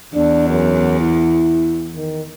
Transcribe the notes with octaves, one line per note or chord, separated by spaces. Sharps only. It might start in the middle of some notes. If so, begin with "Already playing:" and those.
E2 D4
F#2
E4
D#3